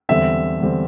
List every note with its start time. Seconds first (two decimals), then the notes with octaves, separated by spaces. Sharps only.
0.09 E2 D3 G3 C4 E5
0.60 E2 D3 G3 C4